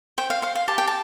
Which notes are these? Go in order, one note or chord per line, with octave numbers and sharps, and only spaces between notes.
C5 G5
F5
C5 F5
F5
G4 A5
G5
A5